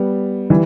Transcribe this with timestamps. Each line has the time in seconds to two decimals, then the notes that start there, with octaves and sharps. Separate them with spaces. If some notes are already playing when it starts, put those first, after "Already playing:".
Already playing: G3 B3
0.50 E3 G3